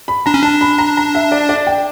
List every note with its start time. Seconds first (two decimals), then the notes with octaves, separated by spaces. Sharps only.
0.08 B5
0.26 D4 A#5
0.34 C#4
0.42 D4 A5
0.61 B5
0.79 A#5
0.97 A#5
1.15 E5
1.32 D5
1.49 D5
1.67 G5